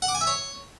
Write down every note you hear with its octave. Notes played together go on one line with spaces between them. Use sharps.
F#5
D6
G#5
E5
C#5